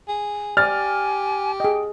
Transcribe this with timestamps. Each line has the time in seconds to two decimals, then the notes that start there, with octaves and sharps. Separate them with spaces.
0.08 G#4
0.57 G4 D5 G#5 F6 A6
1.60 G#4 D#5 G5